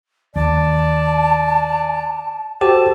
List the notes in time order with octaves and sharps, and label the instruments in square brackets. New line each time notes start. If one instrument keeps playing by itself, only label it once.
[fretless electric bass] D#2 [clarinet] D5 [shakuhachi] A5
[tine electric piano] F#4 G4 C5 [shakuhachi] A4 [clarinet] A5